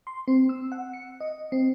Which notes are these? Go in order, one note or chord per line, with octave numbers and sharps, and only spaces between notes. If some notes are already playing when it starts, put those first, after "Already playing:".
C6
C4
E6
F#5
C#7
D#5
C4